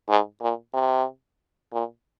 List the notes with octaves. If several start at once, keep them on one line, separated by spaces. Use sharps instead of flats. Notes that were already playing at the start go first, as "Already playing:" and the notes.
G#2
A#2
C3
A#2